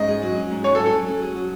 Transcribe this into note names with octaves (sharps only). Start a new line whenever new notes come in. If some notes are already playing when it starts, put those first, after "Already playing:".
Already playing: G#2 C#4 D#5
G#4
F#3
C#4
G#2
G#4 C#5
A4
F#3
A4
F#3
C#4
G#4
F#3